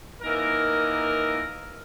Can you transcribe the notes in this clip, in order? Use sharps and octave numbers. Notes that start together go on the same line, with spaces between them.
E3 A#3 D#4 A#4